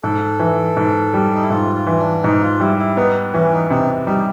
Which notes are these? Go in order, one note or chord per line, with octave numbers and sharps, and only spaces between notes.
G#2 A4
E3
G#2
G3
D#4
E4
G#2 F4
F4
E3
D4
G#2 D#4
F4
G3 E4
E4
B3 D#4
E3 C#4
D#4
C3 D#4
G3 D#4